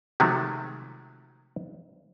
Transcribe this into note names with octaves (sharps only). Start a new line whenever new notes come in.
C3 D#3 F3 F#3 G#3 A3